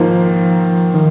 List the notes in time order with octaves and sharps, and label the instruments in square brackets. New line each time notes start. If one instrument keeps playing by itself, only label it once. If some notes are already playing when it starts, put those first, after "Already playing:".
Already playing: [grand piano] G#2 D#3 A#3 F4 [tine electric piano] F3
[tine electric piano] D#3